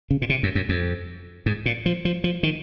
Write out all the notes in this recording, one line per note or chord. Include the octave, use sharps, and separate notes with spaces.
C#3
A#2
C3
F#2
F#2
F2
G#2
A#2
F3
F3
F3
D#3